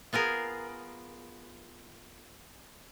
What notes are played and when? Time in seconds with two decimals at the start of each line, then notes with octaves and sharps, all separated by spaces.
0.13 B3 F4 G#4 A#4